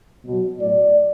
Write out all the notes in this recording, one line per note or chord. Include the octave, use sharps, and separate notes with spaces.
B2 F#3
A2 F#3 D5